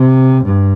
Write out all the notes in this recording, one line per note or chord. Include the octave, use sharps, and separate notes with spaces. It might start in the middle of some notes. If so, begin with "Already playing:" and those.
Already playing: C3
G2